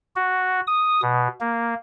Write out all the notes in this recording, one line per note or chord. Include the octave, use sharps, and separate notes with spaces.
F#4
D#6
B2
A#3